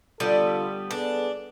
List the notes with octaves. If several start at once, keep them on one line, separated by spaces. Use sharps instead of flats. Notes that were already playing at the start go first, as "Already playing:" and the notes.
D3 G3 B3 F4 A4
B3 D4 G#4 A4